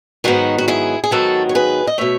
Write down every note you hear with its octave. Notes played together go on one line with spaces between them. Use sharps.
G#2 D#3 F#3 B3 D#4 F#4
F#4
E4 G#4
G#4
G#2 D#3 F#3 B3 F#4 A4
C#5
G#4 B4
D#5
B2 A3 C#5 E5